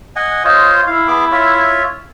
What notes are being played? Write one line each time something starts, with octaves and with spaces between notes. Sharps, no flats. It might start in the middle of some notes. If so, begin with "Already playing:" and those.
D#5 F#5 G#5
F4 C5 C#5 D#5
E4 F5
B3 G#4 D6
F4 C#5 E5